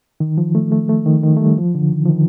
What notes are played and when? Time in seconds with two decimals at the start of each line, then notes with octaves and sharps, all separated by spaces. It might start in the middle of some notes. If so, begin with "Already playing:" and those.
0.20 D#3
0.38 F3
0.55 A3
0.72 A3
0.89 A3
1.06 D#3
1.23 D#3
1.37 A3
1.40 G3
1.58 F3
1.75 D3
1.92 D#3
2.05 F3
2.09 D#3